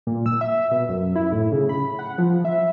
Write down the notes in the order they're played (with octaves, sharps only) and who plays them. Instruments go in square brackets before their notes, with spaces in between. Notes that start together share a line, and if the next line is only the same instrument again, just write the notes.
[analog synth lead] A#2
E6
E5
B2
F#2
E4
A2
C#3
B5
F#5
F3
E5